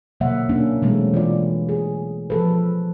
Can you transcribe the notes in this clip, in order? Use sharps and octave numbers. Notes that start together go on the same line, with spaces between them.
B2 D3 F#3 A#3 E5 F#5
A#3 C#4 D4
B2 E3 F#3 G#3 A3 C4
E3 F4 D5
G#4
F3 A4 B4